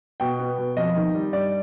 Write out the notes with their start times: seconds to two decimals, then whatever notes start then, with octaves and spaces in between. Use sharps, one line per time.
0.20 B2 G5
0.39 B3
0.58 B2
0.77 F2 D#5
0.96 D#3
1.15 G3
1.33 G2 D5